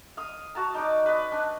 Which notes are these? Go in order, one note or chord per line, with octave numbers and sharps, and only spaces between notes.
F5 D#6
F#4 A5 A#5
D#4 D5 D6
B4 D#5
D4